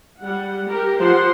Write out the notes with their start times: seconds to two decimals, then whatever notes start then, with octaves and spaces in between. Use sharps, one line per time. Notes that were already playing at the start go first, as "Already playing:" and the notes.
0.22 G3 F#5
0.68 G4 A#4
1.01 F3 C5 F#5 C6